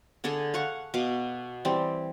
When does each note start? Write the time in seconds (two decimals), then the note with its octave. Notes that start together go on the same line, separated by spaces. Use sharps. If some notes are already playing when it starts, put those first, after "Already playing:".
0.24 D3 D4 G#4 A4
0.54 F5 F#5 C#6
0.94 B2 F5 D6
1.65 E3 G3 C4